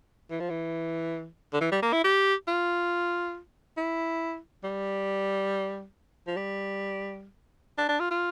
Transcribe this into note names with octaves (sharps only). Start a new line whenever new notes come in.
E3
F3
E3
D3
E3
G3
A#3
E4
G4
F4
E4
G3
F3
G3
D4
D4
F4
F4